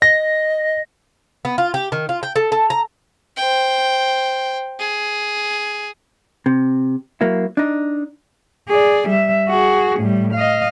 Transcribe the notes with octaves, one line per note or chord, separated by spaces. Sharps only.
D#5 A#6
B3
F4
G4
D#3
F4
G5
A4
A4
A#5
C5 G5
G#4
C3
F#3 A#3 E4
D4 D#4
G#4 D5
G3 E5
F#4 G#4
A2 G3
D#5 F5